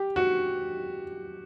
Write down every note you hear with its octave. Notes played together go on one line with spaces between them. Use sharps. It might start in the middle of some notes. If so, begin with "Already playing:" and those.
Already playing: G4
F#4